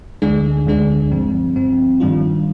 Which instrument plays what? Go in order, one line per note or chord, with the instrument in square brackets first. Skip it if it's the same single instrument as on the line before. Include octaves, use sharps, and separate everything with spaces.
[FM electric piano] D2 D3 G#3 D4 G#4
D2 D3 G#3 D4 G#4
G2 F3 C4
G2 F3 C4
G2 D#3 G3 D4 F4